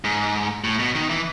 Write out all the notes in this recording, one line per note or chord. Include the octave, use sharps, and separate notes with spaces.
G#2
A2
B2
D#3
E3